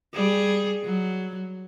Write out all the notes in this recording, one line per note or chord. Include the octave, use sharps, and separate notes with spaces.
G3 G#4
F#3